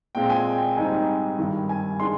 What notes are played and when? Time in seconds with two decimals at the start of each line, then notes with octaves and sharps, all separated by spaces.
0.15 A#2 G#3 C4 G5
0.30 G#5
0.45 G5
0.76 G#2 G3 C4 D#4 G#5
1.38 G2 D#3 G3
1.69 G#5
1.99 D#3 G#3 D4 C6